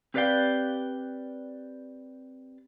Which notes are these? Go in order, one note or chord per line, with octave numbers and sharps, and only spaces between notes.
C4 G4 B4 D5 F5 G5